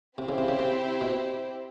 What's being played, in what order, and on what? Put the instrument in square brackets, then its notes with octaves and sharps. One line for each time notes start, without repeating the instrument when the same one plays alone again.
[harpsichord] C3 [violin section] C4 E4 G4 C5
[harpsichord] C#3
C3
C#3
C3
B2